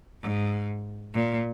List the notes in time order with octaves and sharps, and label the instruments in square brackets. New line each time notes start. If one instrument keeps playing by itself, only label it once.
[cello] G#2
A#2